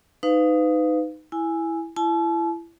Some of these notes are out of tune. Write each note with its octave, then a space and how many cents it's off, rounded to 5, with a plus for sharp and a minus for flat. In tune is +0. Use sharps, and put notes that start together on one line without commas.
D#4 +0 B4 +35 F5 +0
E4 +0 G#5 +0
E4 +30 A5 -40